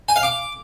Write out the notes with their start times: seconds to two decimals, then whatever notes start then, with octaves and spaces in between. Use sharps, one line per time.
0.09 G#5
0.16 F5
0.23 D6